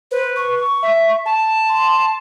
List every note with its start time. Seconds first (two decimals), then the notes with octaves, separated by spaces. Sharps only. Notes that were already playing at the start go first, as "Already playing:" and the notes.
0.11 B4 C5
0.36 C#6
0.83 E5
1.26 A5
1.69 C6